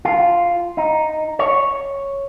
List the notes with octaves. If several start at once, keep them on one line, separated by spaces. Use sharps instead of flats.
F4
D#4
C#5